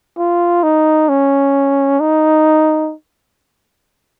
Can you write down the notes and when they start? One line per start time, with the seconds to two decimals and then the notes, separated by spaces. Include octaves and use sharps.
0.18 F4
0.64 D#4
1.09 C#4
2.00 D#4